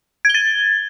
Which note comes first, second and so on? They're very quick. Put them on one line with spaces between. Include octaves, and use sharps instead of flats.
G#6 G7 A6